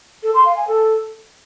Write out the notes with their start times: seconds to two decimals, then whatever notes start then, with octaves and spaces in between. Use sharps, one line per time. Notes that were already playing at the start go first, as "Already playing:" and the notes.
0.23 A4
0.34 C6
0.45 F5
0.56 G#5
0.67 A4